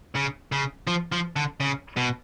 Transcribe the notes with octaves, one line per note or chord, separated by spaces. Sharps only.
C#3
C#3
F3
F3
D3
C#3
B2